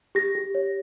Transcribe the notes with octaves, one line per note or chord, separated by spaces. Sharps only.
G4 A#6
G4
C#5